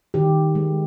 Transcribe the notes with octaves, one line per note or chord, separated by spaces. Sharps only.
D#3 G4
G#3